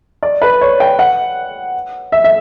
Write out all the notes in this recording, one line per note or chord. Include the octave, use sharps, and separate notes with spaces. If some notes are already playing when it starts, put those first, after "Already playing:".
D5
B4
C#5
G5
F#5
E5
E5